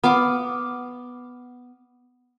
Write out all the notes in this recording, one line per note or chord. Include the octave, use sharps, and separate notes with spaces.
B3 F5 D6